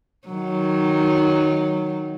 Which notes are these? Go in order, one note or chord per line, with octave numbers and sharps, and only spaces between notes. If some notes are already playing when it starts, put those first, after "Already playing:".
D#3 F#3